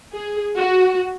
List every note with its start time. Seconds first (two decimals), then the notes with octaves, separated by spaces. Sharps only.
0.12 G#4
0.57 F#4